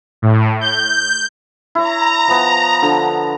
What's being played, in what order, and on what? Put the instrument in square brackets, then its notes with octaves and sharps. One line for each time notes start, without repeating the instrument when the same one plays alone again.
[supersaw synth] A2
G6
[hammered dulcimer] E4 C#5 [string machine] A#5
[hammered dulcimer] F3 B3
D3 F3